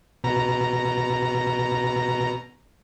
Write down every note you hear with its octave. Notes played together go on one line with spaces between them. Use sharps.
B2 A#5